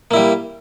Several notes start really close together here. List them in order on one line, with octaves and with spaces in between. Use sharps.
A#3 E4 G3